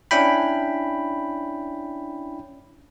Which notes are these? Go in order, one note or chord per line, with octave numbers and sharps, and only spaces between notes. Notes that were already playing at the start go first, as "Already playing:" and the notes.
C#4 D4 E4 G5 B5